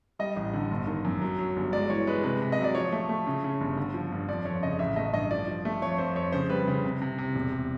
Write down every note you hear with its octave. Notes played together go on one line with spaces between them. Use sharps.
G3 D#5
A1
D3
G1
D#3
F#2
F#3
F#3
G1
G#3 D5
E3 C#5
G#3 B4
C3 B4
C3
D#5
F#3
D5
F3 C#5
A3
A3
C#3
C#3
G1
D3
F3
G2
F2 D5
F2 C#5
C#3 D#5
A1 E5
A3 D#5
G2 D#5
F3 D5
F3
A3
F2 C#5
F2 C5
F2 C#5
C#3 C5
G3 B4
C#3
C3
C3
C3
E1
E1